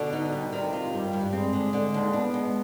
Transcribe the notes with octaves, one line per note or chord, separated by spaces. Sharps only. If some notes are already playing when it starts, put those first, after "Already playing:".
Already playing: B2 D3
D#4
G3
C3 D#3
F4
G2 G3
G2
G#3 C4
D3
D3
D#2
B3 D4
G#3